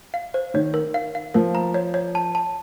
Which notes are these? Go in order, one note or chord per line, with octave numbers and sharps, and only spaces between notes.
F5
C5
D#3 C#5
A#4
F5
F5
F3 A#4
A#5
C#5
C#5
A5
A5